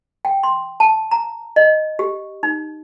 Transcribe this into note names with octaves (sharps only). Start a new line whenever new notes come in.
G5
C6
A5
A#5
D#5
G4
D#4